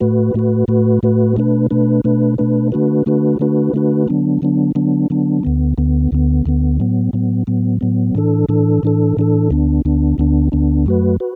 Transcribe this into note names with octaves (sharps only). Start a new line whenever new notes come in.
A2 A3 F#4 B4
A2 A3 F#4 B4
A2 A3 F#4 B4
A2 A3 F#4 B4
B2 A3 D4 B4
B2 A3 D4 B4
B2 A3 D4 B4
B2 A3 D4 B4
D3 A3 D4 F#4 B4
D3 A3 D4 F#4 B4
D3 A3 D4 F#4 B4
D3 A3 D4 F#4 B4
D3 F#3 B3 D4
D3 F#3 B3 D4
D3 F#3 B3 D4
D3 F#3 B3 D4
D2 D3 B3
D2 D3 B3
D2 D3 B3
D2 D3 B3
A2 F#3 B3
A2 F#3 B3
A2 F#3 B3
A2 F#3 B3
A2 E3 D4 A4
A2 E3 D4 A4
A2 E3 D4 A4
A2 E3 D4 A4
D2 D3 B3 D4
D2 D3 B3 D4
D2 D3 B3 D4
D2 D3 B3 D4
F#2 F#3 A3 F#4 B4
F#4 B4